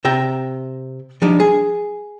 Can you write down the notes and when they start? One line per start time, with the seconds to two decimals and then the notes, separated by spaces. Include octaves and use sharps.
0.04 C3 E5 G5 A#5
1.22 F3 G3 D4 D#4
1.40 G#4